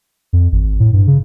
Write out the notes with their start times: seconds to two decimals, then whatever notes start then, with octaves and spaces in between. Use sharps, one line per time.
0.33 F2
0.52 G#1
0.80 A2
0.93 G2
1.07 C#3